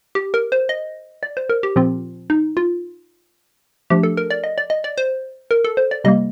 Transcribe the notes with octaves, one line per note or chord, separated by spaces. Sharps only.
G4
A#4
C5
D#5
D5
C5
A#4
G4
A#2 F3 C4 F4
D#4
F4
F3 A3 D4 G4
A4
A#4
D5
D#5
D5
D#5
D5
C5
A#4
A4
C5
D5
C3 G3 A#3 D#5